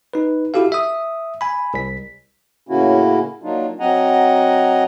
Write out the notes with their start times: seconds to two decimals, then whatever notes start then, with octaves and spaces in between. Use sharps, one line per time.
0.14 D#4 B4
0.54 E4 F#4 G4 A4 F5
0.72 E5 D#6
1.41 G#5 B5
1.74 C2 B6
2.69 A2 C#3 A#3 C#4 E4 F#4
3.43 F#3 A#3 D4 D#4 F4
3.80 F#3 C4 D#5 F#5 G#5 A#5